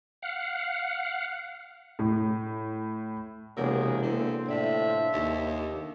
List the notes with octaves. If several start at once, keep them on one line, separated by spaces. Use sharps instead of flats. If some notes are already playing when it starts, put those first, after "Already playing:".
F5 F#5
A2
E1 A2 C3 A#3 G4 G#4 C#5 F#5
D3 A#3 C4 E4
A2 D3 F3 D5 E5
D#2